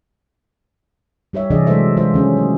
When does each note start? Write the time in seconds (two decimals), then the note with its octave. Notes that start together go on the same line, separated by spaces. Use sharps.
1.33 G3 G4 C#5 E5
1.50 C3 E3 D4 G#4 D5 D#5
1.67 F#3 G#3 D#4 A4 C5 E5
1.96 F#3 G#3 F4 C5 E5
2.14 D#3 C#4 G#4
2.37 F#3 A3 A#3